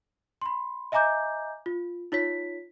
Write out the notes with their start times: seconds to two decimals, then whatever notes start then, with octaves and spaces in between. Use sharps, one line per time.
0.42 B5 C6
0.92 D#5 E5 G#5 A#5 D6 G6
1.66 F4
2.12 D#4 F4 C#5 B6